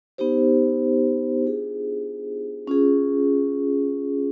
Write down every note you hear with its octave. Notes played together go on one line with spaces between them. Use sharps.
B3 D#4 G4 C5
D4 F4 G#4
C#4 F4 G#4